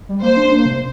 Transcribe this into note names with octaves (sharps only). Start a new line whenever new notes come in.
G3
A#3 C5
D4
A#3
C3